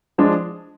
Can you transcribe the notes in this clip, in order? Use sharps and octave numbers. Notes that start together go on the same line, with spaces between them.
F3 G#3 D4